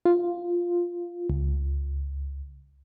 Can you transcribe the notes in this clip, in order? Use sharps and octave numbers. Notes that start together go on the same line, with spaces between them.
F4
C#2